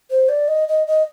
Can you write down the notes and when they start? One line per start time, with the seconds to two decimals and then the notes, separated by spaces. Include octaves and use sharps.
0.11 C5
0.29 D5
0.48 D#5
0.68 D#5
0.87 D#5